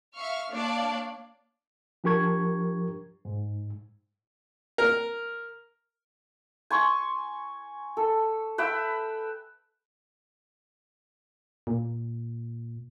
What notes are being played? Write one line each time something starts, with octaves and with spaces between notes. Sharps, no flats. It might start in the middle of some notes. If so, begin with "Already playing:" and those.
E5 F5 C#6 F6
A#3 D4 C#5 D5 F5 A5
F3 D4 G4 A#4 C#6 G#6
G#2
A#4
G#5 C6 C#6
A4
B4 E5 G5 E6
A#2